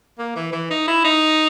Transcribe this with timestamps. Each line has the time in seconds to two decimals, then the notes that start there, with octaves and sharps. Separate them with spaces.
0.19 A#3
0.36 E3
0.53 E3
0.71 D#4
0.88 E4
1.05 D#4